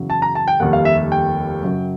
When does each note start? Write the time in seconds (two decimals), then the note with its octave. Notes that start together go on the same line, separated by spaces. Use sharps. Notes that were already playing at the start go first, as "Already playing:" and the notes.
Already playing: F#1 E2 C#3 F#3
0.10 A5
0.22 A#5
0.35 A5
0.48 G5
0.60 F1 D#2 D#3 G3 A#3 F#5
0.73 F5
0.85 E5
1.12 G5
1.63 F#2 C#3 F#3